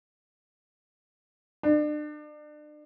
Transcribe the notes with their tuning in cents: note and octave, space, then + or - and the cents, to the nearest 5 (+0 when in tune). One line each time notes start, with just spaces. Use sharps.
D4 +35